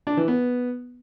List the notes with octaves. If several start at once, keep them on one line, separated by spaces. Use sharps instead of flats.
D4
E3
B3